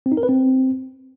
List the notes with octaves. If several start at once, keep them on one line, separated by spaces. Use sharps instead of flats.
C4
D#4
A#4
B4
C4